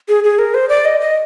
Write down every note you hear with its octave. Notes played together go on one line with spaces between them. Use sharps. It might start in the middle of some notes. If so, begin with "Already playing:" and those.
G#4
G#4
A#4
C5
D5
D#5
D#5